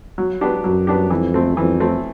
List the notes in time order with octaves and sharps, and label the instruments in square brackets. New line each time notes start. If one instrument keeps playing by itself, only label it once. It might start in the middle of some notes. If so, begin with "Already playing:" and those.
[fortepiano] F#3
B3 D4 G4
[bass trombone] F#2 [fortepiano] F#3
[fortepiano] B3 D4 G4
[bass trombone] F2 [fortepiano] E3
[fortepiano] A3 C4
[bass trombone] F2 [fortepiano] E3
[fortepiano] A3 C4